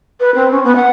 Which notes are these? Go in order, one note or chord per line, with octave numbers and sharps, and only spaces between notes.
B4
C4
C#4
B3
F#5